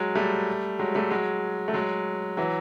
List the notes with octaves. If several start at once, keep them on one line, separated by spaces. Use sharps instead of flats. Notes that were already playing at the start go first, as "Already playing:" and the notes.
Already playing: F#3 G#3
G3 A3
F#3 G#3
G3 A3
F#3 G#3
A3
F#3 G#3
E3 F#3